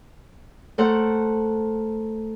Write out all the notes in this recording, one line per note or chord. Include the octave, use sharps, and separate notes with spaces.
A3 A4 A#4 C5 F#5